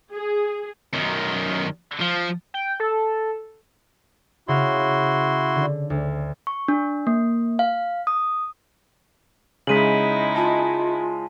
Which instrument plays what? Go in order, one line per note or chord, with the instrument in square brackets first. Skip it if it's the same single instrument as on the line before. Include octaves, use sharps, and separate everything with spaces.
[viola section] G#4
[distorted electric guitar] F#2 D#3
F3
[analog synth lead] G5
A4
[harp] C#3 F5 [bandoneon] E4 F#4 C6
[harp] D3
D2
[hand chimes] C#6
D4
A#3
F5
D#6
[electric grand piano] C#3 G#3 [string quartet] D#4 E4 [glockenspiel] B6 D#7 F#7
[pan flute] F4 [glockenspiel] G#5 A5